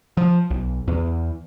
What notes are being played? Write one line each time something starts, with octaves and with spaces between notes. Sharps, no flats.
F3
B1
E2